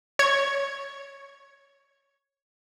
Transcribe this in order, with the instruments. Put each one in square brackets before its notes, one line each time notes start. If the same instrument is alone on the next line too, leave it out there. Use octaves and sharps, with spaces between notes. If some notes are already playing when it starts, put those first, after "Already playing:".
[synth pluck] C#5 G#6